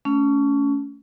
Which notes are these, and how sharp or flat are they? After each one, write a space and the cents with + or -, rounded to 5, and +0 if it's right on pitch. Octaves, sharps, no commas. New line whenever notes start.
A3 +0 C#4 +25